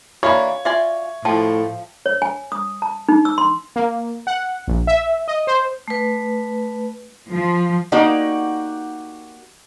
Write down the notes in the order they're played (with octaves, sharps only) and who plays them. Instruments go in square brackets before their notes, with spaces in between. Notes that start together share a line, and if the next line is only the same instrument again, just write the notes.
[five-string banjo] E3 A#3 D4 [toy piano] F#4 F5 [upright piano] C#5
[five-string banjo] F4 D5 G#5 [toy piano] E5
[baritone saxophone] A2 [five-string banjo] F3 [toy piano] G5 A5
[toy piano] C#5
G#5
D#6
A5
D#4
E6
C6
[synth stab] A#3
F#5
A#1
E5
D#5
C5
[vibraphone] A3 B4
[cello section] F3
[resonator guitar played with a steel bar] A#3 D#4 F#4 G4 D5